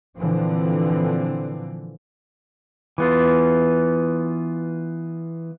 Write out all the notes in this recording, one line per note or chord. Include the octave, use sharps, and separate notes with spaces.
A#2 D3 E3 F3 C4
E3 B3 F4